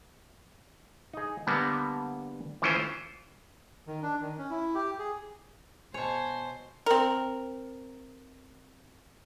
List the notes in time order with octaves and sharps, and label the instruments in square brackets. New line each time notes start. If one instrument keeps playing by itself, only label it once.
[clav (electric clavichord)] D#4 G#4
D3 G3 A#3 B3
E3 A3 C#4 E4 F4 C5
[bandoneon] D#3
D4
D#3
C#4
E4
G4
G#4
[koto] B2 C#5 [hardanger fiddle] C5 [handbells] G#5 A5
[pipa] C4 A#4